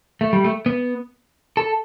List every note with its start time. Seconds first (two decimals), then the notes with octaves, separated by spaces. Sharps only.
0.21 A3
0.33 G3
0.44 A3
0.66 B3
1.57 A4